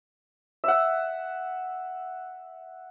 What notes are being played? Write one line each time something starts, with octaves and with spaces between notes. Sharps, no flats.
E5 F#5